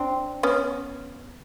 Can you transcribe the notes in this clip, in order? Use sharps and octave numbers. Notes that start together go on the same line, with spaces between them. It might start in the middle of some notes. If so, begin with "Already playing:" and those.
Already playing: C4 D4
B3 C#4